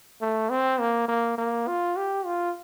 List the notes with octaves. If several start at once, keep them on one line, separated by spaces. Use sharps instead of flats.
A3
C4
A#3
A#3
A#3
F4
G4
F4